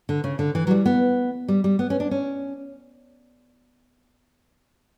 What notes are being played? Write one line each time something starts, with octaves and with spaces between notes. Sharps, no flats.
D3
C#3
D3
E3
F#3
G3
B3
G3
G3
B3
C#4
D4
C#4